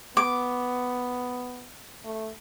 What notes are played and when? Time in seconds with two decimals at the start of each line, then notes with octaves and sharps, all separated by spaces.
0.17 B3 D6
2.04 A3